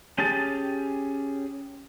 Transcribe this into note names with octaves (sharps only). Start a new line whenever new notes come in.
C#4 G4 G#4 A5